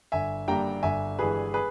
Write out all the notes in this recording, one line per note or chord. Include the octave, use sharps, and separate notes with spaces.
G1 E5 G#5
G2 G3 A#3 G5 A#5
G1 E5 G#5
G2 E3 G#3 G#4 B4
G#4 B4